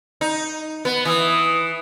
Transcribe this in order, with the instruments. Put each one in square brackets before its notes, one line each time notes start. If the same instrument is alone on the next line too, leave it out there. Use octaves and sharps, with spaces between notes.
[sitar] D#4
B3
[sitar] E3 [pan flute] D#6